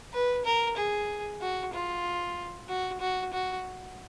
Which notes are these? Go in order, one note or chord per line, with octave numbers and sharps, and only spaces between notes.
B4
A#4
G#4
F#4
F4
F#4
F#4
F#4